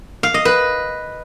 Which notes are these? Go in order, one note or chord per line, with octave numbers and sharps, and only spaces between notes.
F5
D#5
B4